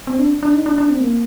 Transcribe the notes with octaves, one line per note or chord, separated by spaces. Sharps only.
C4
D4
D4
D#4
D4
D4
C4
A#3